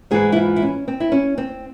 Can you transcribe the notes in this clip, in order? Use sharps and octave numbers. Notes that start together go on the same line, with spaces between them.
G#2 E3 G#4
E4
F4
E4
C#4
C4
E4
C#4
C4